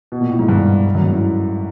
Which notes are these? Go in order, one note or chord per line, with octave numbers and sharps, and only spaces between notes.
B2
A#2
A2
G#2
G2
G2
F#2
G#2
A2